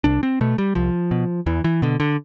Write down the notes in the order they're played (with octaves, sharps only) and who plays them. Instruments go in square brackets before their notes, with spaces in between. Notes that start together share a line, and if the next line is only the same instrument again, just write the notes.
[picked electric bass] C2 D4
C4
B2 A3
G3
C2 F3
B2
E2 E3
E3
B2 D3
D3